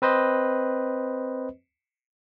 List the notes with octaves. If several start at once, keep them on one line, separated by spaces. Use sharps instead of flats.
C4 B4 C5 D#5